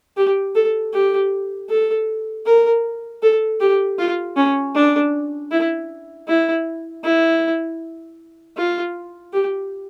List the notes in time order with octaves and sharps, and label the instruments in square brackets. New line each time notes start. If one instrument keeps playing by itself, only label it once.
[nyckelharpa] G4
A4
G4
A4
A#4
A4
G4
F4
C#4
D4
E4
E4
E4
F4
G4